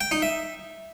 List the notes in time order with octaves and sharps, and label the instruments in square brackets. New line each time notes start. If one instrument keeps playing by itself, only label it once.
[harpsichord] G5
D#4
E5